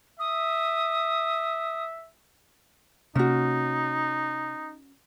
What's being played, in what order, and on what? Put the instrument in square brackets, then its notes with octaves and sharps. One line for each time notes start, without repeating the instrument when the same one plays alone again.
[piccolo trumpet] E5 [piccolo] D#6
[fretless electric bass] C3 A#3 [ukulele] C#4 F#4 [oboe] D#4